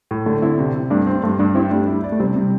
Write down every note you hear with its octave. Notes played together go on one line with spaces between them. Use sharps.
A2
D3 A3
D3 C4 E4
C3
C3
G2 A3 D4
C4
G2 A3
G2 A3 D4
C4 E4 G4
G3 A3 D4
E4
D5
A3
C3 G3 C4
C3 G3